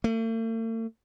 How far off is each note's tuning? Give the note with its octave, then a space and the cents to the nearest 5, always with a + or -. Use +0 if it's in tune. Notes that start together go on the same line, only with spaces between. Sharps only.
A3 +45